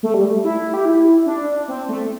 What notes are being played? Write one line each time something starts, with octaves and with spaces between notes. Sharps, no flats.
A3
G3
A3
E4
G4
E4
D4
C4
A3